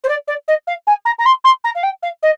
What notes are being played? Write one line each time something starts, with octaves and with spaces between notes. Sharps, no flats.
C5
D5
D5
D#5
F5
G#5
A#5
A#5
C6
C6
A#5
F5
G5
F5
D#5